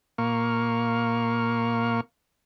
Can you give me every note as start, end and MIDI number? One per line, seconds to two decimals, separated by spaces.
0.18 2.01 46
0.18 2.01 58
0.18 2.01 77
0.18 2.01 85